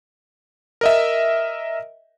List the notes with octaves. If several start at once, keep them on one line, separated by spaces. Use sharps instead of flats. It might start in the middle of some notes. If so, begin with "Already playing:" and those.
A#4 D#5 E5